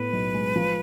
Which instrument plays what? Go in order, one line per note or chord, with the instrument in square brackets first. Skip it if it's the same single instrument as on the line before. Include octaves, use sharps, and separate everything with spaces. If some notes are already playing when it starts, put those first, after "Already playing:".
Already playing: [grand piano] A2 B3 [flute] B4
[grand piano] B1
G#3
F3